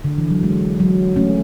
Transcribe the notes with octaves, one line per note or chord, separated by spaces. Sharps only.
D3
E3
F#3
G#3
F#3
A3 C#4